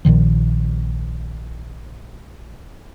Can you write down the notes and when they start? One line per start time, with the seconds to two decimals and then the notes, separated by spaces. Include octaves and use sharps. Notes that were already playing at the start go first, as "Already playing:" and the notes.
0.05 A#1 A#2 D#3 F3